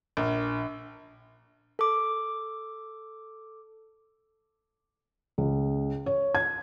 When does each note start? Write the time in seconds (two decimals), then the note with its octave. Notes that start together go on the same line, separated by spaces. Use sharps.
0.17 A#1
1.79 A4 D6
5.38 C#2
6.06 C#5
6.35 G#6